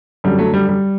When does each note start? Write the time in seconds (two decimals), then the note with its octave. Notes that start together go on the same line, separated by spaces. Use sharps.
0.24 F#2 D3 G3
0.38 F#3 A3
0.54 G3
0.69 G3